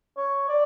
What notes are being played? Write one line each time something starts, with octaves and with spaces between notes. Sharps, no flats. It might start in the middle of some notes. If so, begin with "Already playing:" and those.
C#5
D5